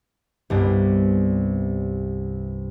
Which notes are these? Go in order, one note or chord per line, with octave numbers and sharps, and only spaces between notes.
C2 G2 B3